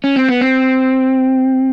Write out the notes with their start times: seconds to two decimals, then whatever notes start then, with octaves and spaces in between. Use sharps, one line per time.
0.04 C#4
0.16 C4
0.29 B3
0.41 C4